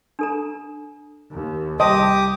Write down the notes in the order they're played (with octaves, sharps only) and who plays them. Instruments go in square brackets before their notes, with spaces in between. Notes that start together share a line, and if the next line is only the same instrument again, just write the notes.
[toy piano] D4 A4 A#5
[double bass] D#2
[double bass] C2 [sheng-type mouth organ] G4 D6 D#6 [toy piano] C5 A5 C6 [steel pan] D#5